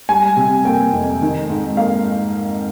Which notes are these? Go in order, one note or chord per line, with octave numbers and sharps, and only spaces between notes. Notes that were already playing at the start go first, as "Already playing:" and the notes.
G3 G#5
C3
A#3 G5
F2
D#3
G#2
A#3 F5